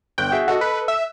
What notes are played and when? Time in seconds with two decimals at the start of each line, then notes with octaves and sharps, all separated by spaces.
0.18 G1 G5 F#6
0.31 F#4 G#4 E5
0.48 F#4 A4 D#5
0.61 B4
0.88 E5